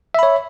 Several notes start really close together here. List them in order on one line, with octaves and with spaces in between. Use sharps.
E5 B5 C#5